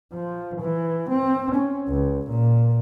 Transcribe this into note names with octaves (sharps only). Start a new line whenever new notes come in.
F3
E3
C4
C#4
C#2
A#2